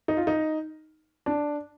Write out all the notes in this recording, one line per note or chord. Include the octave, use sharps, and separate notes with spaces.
D#4
F4
D#4
D4